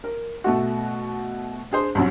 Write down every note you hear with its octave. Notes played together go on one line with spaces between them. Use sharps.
A#4
B2 A3 F#4
D4 G#4 C5
C2 F#2 F#3